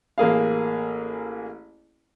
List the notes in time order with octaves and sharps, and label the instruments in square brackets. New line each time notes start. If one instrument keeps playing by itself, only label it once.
[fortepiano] A1 A#3 G#4 F5